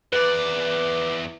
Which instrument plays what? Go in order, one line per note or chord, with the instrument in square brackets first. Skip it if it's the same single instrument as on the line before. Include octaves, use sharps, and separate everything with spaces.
[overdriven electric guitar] E2 D5 [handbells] B4